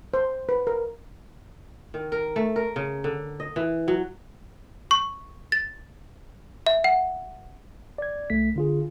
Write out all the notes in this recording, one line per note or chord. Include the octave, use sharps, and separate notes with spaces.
C5
B4
A#4
D#3
A#4
A3
A#4
C#3
D3
D#5
E3
F#3
C#6
A6
E5
F#5
D5 G#6
C2 A3 B6
D3 F4 G#4